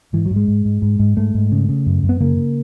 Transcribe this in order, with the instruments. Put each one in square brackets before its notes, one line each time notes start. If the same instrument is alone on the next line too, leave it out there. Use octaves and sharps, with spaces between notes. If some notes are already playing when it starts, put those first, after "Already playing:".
[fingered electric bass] G#2 E3
F#3
G#2
G#3
G#2
G#2
G#2
G#2
G#2 A3
G#2
C#3
C#3
F#2
F#2
B3
C#3 A#3
C#3